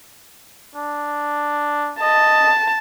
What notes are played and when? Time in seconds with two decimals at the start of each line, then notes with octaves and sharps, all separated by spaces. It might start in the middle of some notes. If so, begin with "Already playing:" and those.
0.75 D4
2.01 D#5 A5